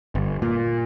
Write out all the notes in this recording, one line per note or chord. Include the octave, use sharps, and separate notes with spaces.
G1
A#2